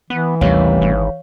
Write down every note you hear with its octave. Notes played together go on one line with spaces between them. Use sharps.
E3 B3
A1 D#2 C3 G3 C#5 F5
G#1